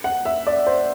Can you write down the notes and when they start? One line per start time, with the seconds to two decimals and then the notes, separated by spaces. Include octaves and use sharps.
0.04 F#5
0.25 E5
0.47 D5
0.67 C5